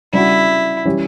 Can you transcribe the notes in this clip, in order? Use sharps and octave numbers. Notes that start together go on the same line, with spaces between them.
C#3 G3 D4 E4 F#4
E3 G3 C#4 G4 C#5